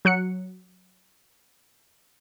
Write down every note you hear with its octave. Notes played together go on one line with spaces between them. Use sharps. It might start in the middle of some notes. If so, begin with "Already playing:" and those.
F#3 F#6 C#7